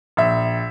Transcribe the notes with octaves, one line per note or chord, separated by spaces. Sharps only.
A#1 E5